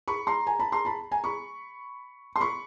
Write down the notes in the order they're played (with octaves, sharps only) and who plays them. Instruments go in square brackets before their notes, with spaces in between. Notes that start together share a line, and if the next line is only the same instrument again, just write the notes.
[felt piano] B5 C#6
A#5 C6
G#5 A#5
A5 B5
A#5 C6
A5 B5
G#5 A#5
B5 C#6
C6
B5 C#6